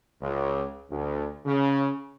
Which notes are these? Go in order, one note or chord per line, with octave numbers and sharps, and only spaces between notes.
C#2
D2
C#3